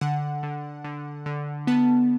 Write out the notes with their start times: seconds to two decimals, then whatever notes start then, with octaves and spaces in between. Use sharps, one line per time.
0.01 D3 F#5
0.43 D3
0.84 D3
1.26 D3
1.67 B3 A5